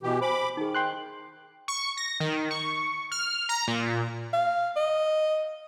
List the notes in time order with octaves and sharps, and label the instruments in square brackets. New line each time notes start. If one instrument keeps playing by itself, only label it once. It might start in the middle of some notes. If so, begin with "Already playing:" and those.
[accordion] B2 E3 G4
[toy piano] C5 G#5 [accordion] B5 D6
[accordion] D#3 [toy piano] D#4 G#4
[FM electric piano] G5 C6 F#6
[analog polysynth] C#6
A#6
D#3
C#6
F6
A#5
A#2
[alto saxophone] F5
D#5